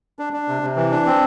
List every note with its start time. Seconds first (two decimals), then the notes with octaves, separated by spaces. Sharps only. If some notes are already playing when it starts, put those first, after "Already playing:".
0.19 D4
0.33 D4
0.48 C3
0.62 C3
0.76 E3
0.91 D4
1.06 C4